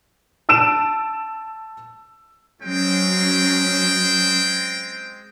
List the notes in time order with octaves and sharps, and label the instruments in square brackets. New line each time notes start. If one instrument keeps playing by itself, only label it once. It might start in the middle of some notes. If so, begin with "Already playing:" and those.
[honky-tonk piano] A5 E6 D7 E7
[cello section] F#3 C#4 [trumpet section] G#3 C4 G5